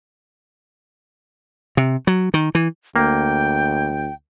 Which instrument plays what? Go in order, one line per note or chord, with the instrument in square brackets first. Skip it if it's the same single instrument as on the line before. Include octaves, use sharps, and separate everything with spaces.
[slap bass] C3
F#3
D#3
E3
[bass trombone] D2 [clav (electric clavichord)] A#3 [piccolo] G5